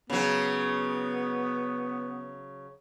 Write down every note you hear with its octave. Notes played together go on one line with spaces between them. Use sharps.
C#3 F#3 B3